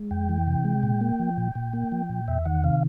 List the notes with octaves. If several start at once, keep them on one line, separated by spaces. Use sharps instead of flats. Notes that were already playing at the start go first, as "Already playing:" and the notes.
Already playing: G#3
F2 G5
E3
C3
G#3
A#2
A#3
F3
A#2
A#2
A#3
F3
A#2
E2 E5
D#3 F#5
C3 F5